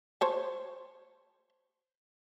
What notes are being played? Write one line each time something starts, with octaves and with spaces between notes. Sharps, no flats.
C5 C#5 A5